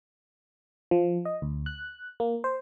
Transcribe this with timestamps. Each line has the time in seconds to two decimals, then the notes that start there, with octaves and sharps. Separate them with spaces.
0.91 F3
1.25 D#5
1.42 D2
1.66 F#6
2.20 A#3
2.44 C5